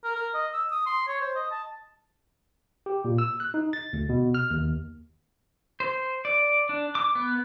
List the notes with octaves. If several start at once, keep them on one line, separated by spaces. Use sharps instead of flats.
A#4
A#4
D#5
E6
D#6
C6
C#5
C5
D#5
A5
G4
A#2
E6
F#6
D#4
A6
D2
B2
F6
D#2
C5
D5
D4
D6
B3